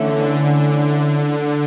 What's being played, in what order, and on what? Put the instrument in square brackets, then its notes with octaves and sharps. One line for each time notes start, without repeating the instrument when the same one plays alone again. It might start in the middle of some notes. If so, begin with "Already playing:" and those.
Already playing: [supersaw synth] D3 [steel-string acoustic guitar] E3 A3 C#4